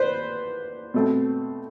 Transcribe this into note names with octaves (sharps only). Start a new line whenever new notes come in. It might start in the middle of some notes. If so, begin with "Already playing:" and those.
Already playing: B4 C5 D5
B2 A3 C4